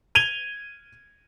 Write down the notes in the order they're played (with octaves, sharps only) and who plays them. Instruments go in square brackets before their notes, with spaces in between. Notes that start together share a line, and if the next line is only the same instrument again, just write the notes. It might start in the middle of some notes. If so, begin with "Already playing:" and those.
[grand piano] G#6 D#7 F7 G7